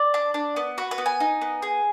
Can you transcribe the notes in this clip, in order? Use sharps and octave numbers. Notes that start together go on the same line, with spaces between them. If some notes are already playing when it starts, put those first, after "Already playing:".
Already playing: D5
D4
D4
B3
F#4 B4
B4
B3
G#5
D#4
B3
G#4